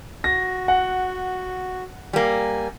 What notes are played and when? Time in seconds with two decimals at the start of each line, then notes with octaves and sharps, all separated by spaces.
0.24 F#4 A#6
0.68 F#5
2.13 G3 A#3 G#5